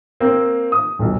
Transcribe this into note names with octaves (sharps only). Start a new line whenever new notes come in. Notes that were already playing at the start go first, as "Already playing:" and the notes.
A#3 C4
D#6
D#1 B1